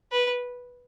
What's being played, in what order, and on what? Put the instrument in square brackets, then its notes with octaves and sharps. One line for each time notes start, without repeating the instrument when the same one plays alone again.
[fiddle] B4